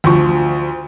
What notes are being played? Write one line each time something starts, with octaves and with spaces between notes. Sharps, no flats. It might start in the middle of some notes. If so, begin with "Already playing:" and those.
D2 F3 C#6